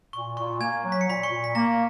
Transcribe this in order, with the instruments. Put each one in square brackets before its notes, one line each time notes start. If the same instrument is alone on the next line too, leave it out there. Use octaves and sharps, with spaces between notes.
[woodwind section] A#2 [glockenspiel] C#6
[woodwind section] A#2 [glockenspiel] C#6
[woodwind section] A#3 [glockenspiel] G#5 G#6
[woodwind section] F#3
[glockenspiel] B6
C#7
[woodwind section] A#2 [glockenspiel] B5 B6
[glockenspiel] C#6 C#7
[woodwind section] A#2
[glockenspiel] B6
[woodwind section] A#3 [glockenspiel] A#5 A#6